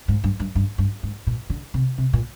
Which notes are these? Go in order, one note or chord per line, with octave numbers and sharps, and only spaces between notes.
G#2
G2
G2
G2
G2
G#2
A#2
D3
C3
C3
A#2